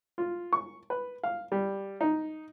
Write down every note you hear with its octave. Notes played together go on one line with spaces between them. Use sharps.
F4
C#6
B4
F5
G3
D#4